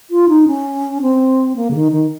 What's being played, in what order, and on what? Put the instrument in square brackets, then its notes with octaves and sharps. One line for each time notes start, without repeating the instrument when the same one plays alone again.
[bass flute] F4
D#4
C#4
C4
A#3
C#3
D#3
D#3